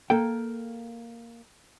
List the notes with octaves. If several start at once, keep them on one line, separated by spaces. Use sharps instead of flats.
A#3 A4 G5